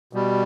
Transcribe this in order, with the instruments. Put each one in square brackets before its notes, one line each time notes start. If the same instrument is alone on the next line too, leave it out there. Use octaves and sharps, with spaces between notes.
[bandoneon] B2 G3